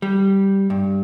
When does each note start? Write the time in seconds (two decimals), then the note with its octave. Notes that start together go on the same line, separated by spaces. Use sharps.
0.02 G3
0.70 G2